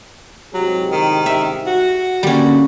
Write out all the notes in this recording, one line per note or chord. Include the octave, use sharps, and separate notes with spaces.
C2 G#2 F#3 G4
D#3
E5
F#4
D3 G3 A#3 C#4